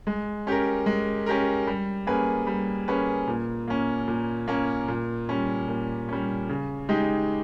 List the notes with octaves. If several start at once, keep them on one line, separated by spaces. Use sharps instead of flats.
G#3
C#4 G4 A#4
G#3
C#4 G4 A#4
G3
A#3 C#4 G#4 B4
G3
A#3 C#4 G#4 B4
A#2
A#3 C#4
A#2
A#3 C#4
A#2
G3 C#4
A#2
G3 C#4
C#3
G#3 D#4 G4